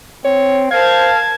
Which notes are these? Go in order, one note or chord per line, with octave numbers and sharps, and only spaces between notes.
C4 C#5
A#4 C5 F5 A5 G#6